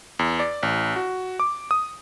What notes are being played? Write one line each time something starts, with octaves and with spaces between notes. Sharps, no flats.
E2
D5
A1
F#4
D6
D#6